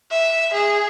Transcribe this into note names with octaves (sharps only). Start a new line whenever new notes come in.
E5
G#4